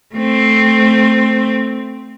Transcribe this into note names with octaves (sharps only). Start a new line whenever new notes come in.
A3 C4